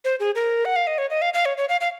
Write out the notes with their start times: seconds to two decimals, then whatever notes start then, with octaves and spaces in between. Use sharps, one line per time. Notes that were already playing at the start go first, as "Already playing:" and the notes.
0.05 C5
0.20 G#4
0.35 A#4
0.65 F#5
0.76 F5
0.87 D#5
0.98 C#5
1.10 D#5
1.22 F5
1.34 F5
1.45 C#5
1.57 C#5
1.69 F5
1.81 F5